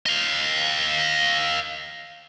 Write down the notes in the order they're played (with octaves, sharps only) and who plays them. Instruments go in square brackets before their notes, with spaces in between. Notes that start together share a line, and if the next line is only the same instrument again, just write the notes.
[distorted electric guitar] D#5 F5